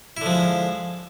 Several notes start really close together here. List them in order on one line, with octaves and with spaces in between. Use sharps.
E4 D3 F3 G#3